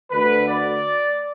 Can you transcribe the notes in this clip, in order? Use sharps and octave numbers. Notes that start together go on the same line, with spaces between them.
D2 D3 B4
D5